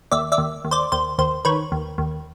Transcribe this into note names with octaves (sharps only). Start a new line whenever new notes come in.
D#2 D5 E5
D5 E5
D#2
D#2
C5 D5
D#2 C5
D#2 C5
D#3 B4 C#5
D#2
D#2